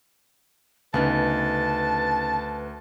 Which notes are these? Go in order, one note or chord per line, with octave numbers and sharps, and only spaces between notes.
D2 C#3 B3 D#4 B4 A5